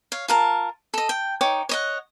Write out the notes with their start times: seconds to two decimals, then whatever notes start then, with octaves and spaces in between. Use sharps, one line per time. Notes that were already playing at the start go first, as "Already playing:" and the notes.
0.12 C#5 F5
0.28 F4 A#4 A5
0.94 A4 D#5
1.09 G5
1.41 D#4 C#5 G5 D6
1.69 C#5 D#5 F#5